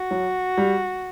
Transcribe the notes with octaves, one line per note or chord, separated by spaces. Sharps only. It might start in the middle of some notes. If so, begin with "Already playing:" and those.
Already playing: F#4
F#3
G3